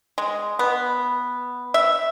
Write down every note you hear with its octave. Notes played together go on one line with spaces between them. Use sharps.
G#3
B3
E5